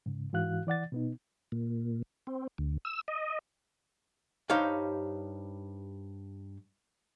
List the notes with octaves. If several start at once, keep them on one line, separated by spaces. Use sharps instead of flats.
G#2 C#3
G#2 E3 F#4 F5 F#6
E3 D5 F#5 A6
B2 B3 D#4
A#2
C4
D2
E6
D#5
G2 D#4 G4 C5 C#5 F5